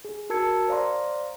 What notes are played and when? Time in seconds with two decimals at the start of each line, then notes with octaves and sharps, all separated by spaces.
0.05 G#4
0.30 F#4 A#4 A5 E6 G#6 C#7
0.68 C5 D5 F5 A#5 C6